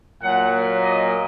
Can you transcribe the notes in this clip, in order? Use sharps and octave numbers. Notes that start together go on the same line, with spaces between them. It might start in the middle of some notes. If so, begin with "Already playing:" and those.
A#2 F#3 A#3 F#5
D#5